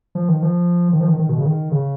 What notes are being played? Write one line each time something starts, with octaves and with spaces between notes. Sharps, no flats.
F3
D#3
F3
D#3
F3
D#3
D#3
B2
C#3
D#3
C#3